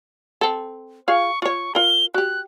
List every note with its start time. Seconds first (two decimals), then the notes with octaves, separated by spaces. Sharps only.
0.41 C4 A4
1.08 F4 G#4 F5 C#6
1.42 F4 C#5 C#6
1.75 F4 A#4 G7
2.14 F#4 G4 F#6